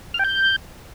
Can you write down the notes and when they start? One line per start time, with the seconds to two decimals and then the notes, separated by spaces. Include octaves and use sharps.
0.14 F6
0.19 G5
0.24 G6